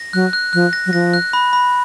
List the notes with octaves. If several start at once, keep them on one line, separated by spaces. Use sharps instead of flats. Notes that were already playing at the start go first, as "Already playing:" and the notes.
Already playing: A#6
F#3 F#6
F#6
F3 F#6
A#6
F#3
F3 A#6
F#6
B5
B5